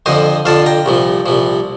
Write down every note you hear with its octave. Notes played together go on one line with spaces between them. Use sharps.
F2 D3 F3 C5 D#5
F2 D3 F3 F5 A5
G5 A#5
C2 A#2 F3
C2 A#2 F3